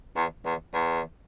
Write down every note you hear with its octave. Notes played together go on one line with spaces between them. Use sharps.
E2
E2
E2